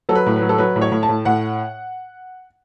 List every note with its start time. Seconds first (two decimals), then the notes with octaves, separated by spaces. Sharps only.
0.09 F#3 A4
0.15 B4
0.26 A2
0.36 B4
0.42 F#3
0.49 A4
0.58 F#3 B4
0.76 A2
0.82 C#5
0.92 A2
1.03 A5
1.09 A2
1.25 A2 F#5